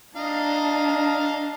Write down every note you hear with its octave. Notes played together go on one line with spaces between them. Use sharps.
D4 D#5 F5 A#5